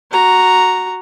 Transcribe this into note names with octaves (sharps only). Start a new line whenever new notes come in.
F#4 A#5